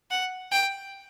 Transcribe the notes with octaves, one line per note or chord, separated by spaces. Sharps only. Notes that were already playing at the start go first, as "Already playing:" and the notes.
F#5
G5